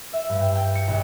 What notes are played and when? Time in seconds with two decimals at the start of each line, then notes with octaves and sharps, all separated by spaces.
0.13 E5
0.29 G2
0.41 G5
0.55 G5
0.75 C#7
0.88 A#1